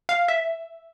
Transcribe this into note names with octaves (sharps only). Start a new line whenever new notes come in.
F5
E5